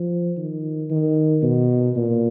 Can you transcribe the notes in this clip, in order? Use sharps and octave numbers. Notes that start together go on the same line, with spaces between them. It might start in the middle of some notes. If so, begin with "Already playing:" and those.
Already playing: F3
D#3
D#3
B2
A#2